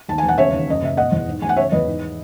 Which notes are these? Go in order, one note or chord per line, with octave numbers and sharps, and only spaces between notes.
D#2 A5
E1 G#5
F#5
C#3 C#5 E5
D#2
F#2 D#5
F#1 E5
B2 D#5 F#5
E2
G#2
A1 G#5
F#5
C#3 C#5 E5
E2 B4 D#5
G#2